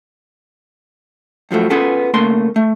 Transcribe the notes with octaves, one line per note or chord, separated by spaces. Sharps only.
G2 F3 F#3 A3
B3 C#4 F4 G#4 A4 B4
C#3 A3 A#3 C6
A3